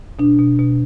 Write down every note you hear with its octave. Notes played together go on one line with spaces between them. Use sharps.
B2 D4
B2
B2